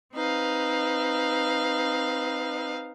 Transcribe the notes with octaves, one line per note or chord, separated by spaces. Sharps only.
C4 D#4 B4 F5